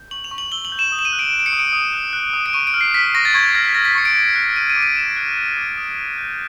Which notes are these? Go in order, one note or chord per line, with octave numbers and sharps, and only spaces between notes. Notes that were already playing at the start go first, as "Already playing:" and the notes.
Already playing: G6
C#6 F#7
F7
C#6
F#7
E6 G7
F#7
G6
E7
D#6
E7
D#7
F#6
D7
F#6
D7
C#7
D#6
D7
D#6
F#6
F#6
D#6
D7
C#6 D#7
D7
F6
C7
F6 B6
C#6 A#6
A6
C#6 G#6
G#6
F6 A#6
B6
F6 A#6
B6
C#6 C#7
D7
D6
F#6
F#6 D#7
D#7
D6
D#7
D6 E7
F#6
F#6
D6
D#6
G6
G6